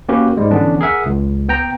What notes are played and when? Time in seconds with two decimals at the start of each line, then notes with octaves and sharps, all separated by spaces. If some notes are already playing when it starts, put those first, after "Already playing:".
0.09 A#3 C#4 F#4 G4 B4
0.37 G#2 G3 G#3
0.51 D3 E3 B3 C#4 D4
0.81 G#4 A#4 E5 F#5
1.06 C#2
1.48 B3 G5 A#5